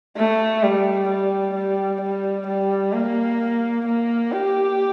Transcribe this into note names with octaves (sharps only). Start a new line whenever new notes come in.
A3
G3
G3
G3
G3
G3
A#3
A#3
G4